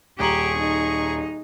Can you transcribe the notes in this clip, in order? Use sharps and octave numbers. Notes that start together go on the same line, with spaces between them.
D#1 G4 G#4 A#5 C#6 F#7
D#4